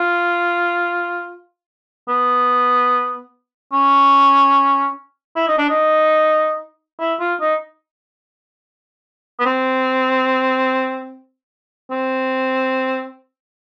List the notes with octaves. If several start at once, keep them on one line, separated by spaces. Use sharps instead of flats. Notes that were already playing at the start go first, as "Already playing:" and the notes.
Already playing: F4
B3
C#4
E4
D#4
D4
D#4
E4
F4
D#4
B3
C4
C4